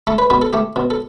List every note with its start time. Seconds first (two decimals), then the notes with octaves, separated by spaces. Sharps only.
0.07 A3 A4
0.18 B4
0.30 B2 B4
0.42 A4
0.53 A3 G4
0.76 B2
0.90 A4